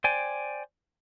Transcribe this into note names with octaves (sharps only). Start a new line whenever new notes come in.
C5 D5 G5 G#5